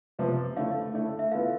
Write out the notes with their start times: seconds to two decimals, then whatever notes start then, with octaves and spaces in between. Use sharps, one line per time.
0.19 C3 F3 B3
0.56 D3 A3 E4 F5
0.94 D3 A3 E4
1.19 E5
1.32 E3 B3 F4 A4 F5